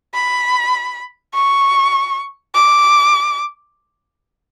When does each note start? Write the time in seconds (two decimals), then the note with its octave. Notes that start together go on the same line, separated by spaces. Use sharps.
0.14 B5
1.34 C#6
2.55 D6